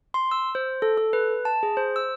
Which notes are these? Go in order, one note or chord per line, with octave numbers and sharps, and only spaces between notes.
C6
E6
C5
A4
A4
B4
A5
G#4
C5
E6